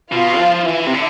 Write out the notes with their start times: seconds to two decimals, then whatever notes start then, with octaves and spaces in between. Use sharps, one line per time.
0.12 B2 F4 F5
0.39 F3
0.66 E3 E4 E5
0.87 C3
0.94 D3